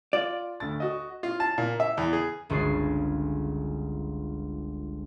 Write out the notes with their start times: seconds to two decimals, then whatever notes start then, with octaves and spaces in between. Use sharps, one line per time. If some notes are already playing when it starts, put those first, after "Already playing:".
0.13 F4 D5
0.60 D2 A6
0.80 F#4 D#5
1.23 F4
1.40 A5
1.58 A#2
1.80 E5
1.97 E2
2.13 G#4
2.50 G1 C#2 F#4 G#4 D5 C7